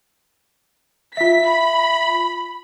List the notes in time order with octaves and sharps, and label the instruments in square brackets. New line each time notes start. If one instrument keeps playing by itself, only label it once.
[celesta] F4 E5 [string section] B6
[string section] B5